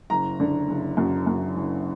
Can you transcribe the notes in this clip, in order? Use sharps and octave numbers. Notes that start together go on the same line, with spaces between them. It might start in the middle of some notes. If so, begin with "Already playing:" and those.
F#1 A#5
D3
F#1
F#2
F#2
F#1